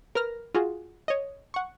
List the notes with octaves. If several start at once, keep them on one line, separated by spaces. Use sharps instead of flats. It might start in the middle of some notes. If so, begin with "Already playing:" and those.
A#4 B4 F6 A#6
F4 F#4 G#4
C#5 D#5
F#5 C#6